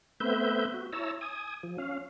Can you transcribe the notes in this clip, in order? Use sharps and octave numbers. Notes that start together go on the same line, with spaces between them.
A3 B3 C4 B4 E5 G6
F#4
E4 C#5 A5 A#5 E6
G#5 D#6
F3
C#4 F5